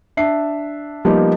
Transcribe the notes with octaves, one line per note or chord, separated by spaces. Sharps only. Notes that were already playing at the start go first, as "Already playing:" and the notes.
D4 E5 C7
F3 G3 A#3 B3 D#4 G4